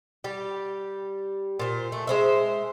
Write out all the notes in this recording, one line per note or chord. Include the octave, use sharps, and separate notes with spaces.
G3 G4
A#2 C5
A3
G#3 C5 E5